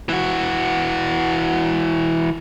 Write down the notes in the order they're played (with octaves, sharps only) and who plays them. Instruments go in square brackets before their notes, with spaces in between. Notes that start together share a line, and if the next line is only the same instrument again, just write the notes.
[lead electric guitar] E3 F#4